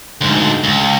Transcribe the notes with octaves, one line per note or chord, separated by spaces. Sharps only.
D2 G#2
C#2